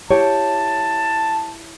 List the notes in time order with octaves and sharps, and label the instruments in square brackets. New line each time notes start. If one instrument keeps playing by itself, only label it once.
[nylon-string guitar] E4 G4 C#5 [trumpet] A5